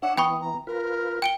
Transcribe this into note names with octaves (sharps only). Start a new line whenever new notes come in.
D4 C#5 E5 F#5
E3 B3 G5 B5 C#6 D#6
A#5
F4 A#4 B4
G5 D7 G7